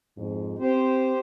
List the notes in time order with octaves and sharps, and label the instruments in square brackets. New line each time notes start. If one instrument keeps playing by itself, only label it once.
[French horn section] F2 G#2
[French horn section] C4 [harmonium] G4 C5